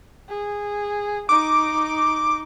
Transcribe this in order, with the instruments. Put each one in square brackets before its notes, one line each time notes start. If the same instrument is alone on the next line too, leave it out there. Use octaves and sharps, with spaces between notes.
[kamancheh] G#4
[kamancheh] D#4 [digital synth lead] D6